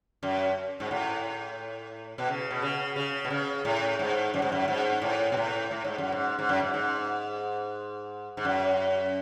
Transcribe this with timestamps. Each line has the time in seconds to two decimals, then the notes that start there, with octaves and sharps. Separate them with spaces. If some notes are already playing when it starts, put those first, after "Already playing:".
0.23 F#2
0.80 G#2
0.91 A2
2.18 B2
2.28 C#3
2.51 B2
2.62 C#3
2.96 C#3
3.25 B2
3.30 C#3
3.65 A2
3.99 G#2
4.34 F#2
4.42 G#2
4.52 F#2
4.68 G#2
5.02 A2
5.32 B2
5.37 A2
5.71 A2
5.84 G#2
5.98 F#2
6.12 G#2
6.39 G#2
6.49 F#2
6.60 G#2
6.74 G#2
8.37 G#2
8.45 F#2